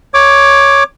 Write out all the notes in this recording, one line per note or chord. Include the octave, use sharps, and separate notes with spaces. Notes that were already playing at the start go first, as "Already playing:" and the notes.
C#5 D6